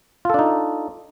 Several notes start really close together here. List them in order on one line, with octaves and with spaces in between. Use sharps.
F4 A4 D4 D#4